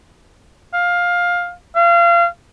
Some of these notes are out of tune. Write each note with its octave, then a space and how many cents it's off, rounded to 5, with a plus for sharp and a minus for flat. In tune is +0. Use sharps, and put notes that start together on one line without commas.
F5 +15
F5 -30